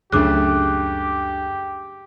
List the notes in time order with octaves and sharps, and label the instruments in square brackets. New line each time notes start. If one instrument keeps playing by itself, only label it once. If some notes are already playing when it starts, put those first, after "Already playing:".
[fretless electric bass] C#2 F#2 [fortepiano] C#3 A3 [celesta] D4 D6 F#6 [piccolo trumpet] G4